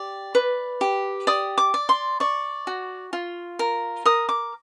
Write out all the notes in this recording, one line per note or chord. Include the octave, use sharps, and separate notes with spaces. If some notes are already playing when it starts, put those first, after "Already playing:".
Already playing: G4 D5
B4
G4
D5 D#6
D6
D5
C6
D5 C#6
F#4
F4
A#4
A#4 D#6
D6